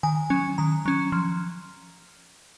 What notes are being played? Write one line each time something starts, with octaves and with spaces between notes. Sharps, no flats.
D#3 G#5
F#3 C#4
D#3 A#5
F#3 C#4
F3